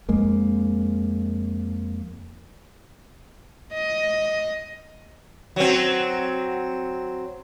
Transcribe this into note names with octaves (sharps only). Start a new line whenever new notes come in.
F2 G#3 A#3
D#5
F#3 C4